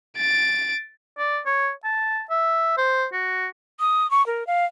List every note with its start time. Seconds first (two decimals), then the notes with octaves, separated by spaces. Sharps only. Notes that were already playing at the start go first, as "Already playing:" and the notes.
0.17 A6 D7
1.18 D5
1.46 C#5
1.84 A5
2.30 E5
2.77 C5
3.12 F#4
3.80 D#6
4.11 C#6
4.26 A#4
4.47 F5